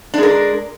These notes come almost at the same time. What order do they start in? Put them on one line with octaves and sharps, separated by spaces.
D4 G#3 A#4